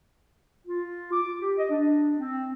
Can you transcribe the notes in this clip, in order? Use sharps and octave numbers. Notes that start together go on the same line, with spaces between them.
F4
D6
G4
D#5
D4
C4